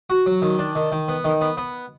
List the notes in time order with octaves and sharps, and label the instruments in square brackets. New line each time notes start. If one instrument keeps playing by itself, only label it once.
[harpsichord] F#4
F#3
D#3
D4
D#3
D#3
B3
D#3
B3
B3